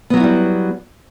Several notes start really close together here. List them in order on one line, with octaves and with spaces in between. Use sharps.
B3 F#3 F#4 E4 G3